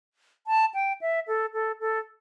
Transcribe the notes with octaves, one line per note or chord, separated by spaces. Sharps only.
A5
G5
E5
A4
A4
A4